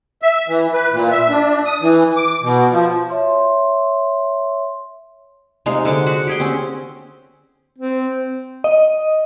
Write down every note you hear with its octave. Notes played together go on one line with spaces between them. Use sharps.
E5
E3
B4
A#2
E5
D4
D#6
E3
D6
B2
F3
C#5 E5 C6
C3 G#3 D#4 F5
D3 G#3 D6
F#4
G4 G#4 G5
C4 C#4
C4
D#5